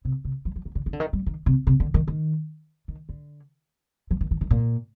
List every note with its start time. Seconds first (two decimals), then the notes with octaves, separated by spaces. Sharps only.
0.05 C3
0.25 C3
0.45 F3
0.56 F3
0.65 D#3
0.75 D3
0.86 D#3
0.93 D3
1.00 D#3
1.13 G3
1.26 D#3
1.46 C3
1.67 C3
1.80 D3
1.94 D#3
2.08 D#3
2.88 D#3
3.09 D3
4.11 F3
4.21 D#3
4.31 D#3
4.41 D#3
4.51 A#2